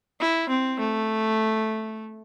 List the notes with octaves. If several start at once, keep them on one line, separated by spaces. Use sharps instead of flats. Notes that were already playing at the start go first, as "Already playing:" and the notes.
E4
C4
A3